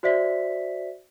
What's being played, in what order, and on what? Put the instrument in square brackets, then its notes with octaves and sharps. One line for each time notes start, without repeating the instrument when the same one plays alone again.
[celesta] F#4 C5 D5 E5 B6